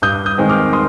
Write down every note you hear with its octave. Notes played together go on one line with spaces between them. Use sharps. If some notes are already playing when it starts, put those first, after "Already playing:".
G2 D#6 G6
D#6 G6
D#3 G#3 C4
D6 F6
C6 D#6